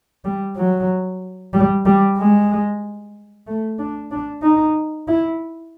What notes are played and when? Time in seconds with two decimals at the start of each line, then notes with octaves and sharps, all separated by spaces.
0.25 G3
0.57 F#3
1.54 G3
1.86 G3
2.18 G#3
3.47 A3
3.79 D4
4.11 D4
4.43 D#4
5.08 E4